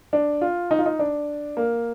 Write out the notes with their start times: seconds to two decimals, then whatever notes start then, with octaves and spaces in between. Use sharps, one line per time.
0.13 D4
0.41 F4
0.71 D#4
0.79 F4
0.86 D#4
0.99 D4
1.57 A#3